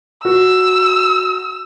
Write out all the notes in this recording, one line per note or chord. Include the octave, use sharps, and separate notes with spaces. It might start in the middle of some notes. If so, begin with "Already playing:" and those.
F#4 E6